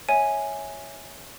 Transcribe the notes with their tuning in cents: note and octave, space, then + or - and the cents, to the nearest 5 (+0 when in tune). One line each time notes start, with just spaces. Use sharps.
C#5 +0 E5 -15 G#5 +0